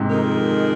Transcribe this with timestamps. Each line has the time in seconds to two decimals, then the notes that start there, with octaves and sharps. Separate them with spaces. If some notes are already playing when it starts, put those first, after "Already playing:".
Already playing: G#2 C3
0.09 F2 D#3 G#3 D#4 A#4